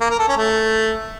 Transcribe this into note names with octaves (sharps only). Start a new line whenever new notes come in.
A#3
A#4
A4
C#4
A3